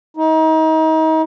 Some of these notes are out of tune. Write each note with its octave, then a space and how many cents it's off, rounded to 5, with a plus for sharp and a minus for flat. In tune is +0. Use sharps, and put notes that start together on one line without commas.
D#4 +35